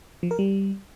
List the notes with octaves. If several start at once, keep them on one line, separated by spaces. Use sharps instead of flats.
F3
A#4
G3